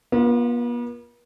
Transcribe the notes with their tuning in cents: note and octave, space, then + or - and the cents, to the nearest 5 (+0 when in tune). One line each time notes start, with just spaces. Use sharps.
B3 -45 F4 +0